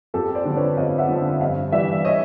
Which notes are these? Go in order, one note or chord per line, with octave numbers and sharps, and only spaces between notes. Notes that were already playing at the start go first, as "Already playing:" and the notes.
F2 G4 A4
C5 D5
D3 F3
B4 C#5
F2 D#5 F5
E5 F#5
D3 F3
G2 D#5 F5
E3 G3 D5 E5
C#5 D#5